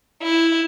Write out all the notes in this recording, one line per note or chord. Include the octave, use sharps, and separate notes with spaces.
E4